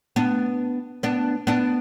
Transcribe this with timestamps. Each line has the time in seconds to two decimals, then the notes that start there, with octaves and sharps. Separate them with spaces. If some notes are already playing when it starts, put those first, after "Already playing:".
0.16 B3 D4
1.03 B3 D4
1.47 B3 D4